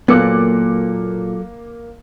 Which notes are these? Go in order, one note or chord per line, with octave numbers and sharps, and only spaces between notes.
A#2 F#3 A#3 B3 A4 D6 F#6 C#7